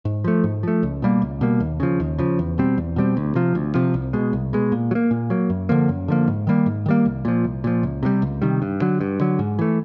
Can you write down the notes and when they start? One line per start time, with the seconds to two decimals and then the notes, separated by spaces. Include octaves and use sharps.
0.05 G#2
0.24 F3 A3
0.44 G#2
0.63 F3 A3
0.83 C#2
1.02 B2 G3 A#3
1.22 C#2
1.41 B2 G3 A#3
1.60 D#2
1.80 C#3 F3
2.00 D#2
2.18 C#3 F3
2.39 E2
2.58 B2 G3 C4
2.78 E2
2.96 B2 G3 C4
3.17 D2
3.35 C3 F3
3.55 D2
3.74 C3 F3
3.94 C2
4.13 B2 G#3
4.33 C2
4.53 B2 G#3
4.72 A#2
4.91 F#3
4.95 A#3
5.11 A#2
5.30 F#3 A#3
5.50 F#2
5.69 D3 F3 A#3
5.89 F#2
6.08 D3 F3 A#3
6.27 G#2
6.47 D#3 G3 A#3
6.66 G#2
6.86 D#3 G3 A#3
7.05 C2
7.25 A#2 F3
7.44 C2
7.64 A#2 F3
7.83 C#2
8.03 C3 D#3 G3
8.22 C#2
8.42 C3 D#3 G3
8.62 G2
8.81 D3 F#3
9.01 G2
9.20 D3 F#3
9.39 G#2
9.59 E3 A3